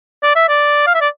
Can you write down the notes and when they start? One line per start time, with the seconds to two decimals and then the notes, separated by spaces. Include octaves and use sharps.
0.23 D5
0.36 E5
0.49 D5
0.87 F5
0.95 E5
1.01 D5